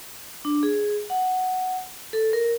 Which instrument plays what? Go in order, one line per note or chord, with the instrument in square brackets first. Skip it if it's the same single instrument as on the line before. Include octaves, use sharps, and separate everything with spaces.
[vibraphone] D4
G#4
F#5
A4
A#4